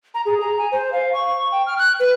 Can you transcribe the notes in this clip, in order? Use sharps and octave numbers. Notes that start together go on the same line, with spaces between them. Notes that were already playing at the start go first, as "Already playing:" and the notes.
A#5
G#4
A#5
G#5
C5
F5
C#6
G5
F6
F#6
B4